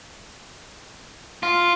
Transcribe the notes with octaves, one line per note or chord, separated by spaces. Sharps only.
F4